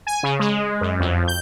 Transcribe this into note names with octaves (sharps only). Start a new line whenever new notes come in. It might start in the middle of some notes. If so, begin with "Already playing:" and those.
G#5
C#3
G#3
F#2
F2
G6